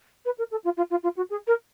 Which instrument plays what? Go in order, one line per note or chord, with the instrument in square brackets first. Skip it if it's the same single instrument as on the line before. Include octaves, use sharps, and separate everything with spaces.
[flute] B4
A#4
A4
F4
F4
F4
F4
F#4
G#4
A#4